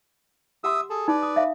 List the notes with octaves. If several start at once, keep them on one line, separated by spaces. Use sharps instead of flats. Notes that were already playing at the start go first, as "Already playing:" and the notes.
G4 E5 F#5 C6 D#6 E6
G#4 A4
D#4 B4 D5
D#6
E5 F5